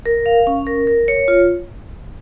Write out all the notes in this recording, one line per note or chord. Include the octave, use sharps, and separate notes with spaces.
A#4
F5
C#4
A#4
A#4
C#5
F4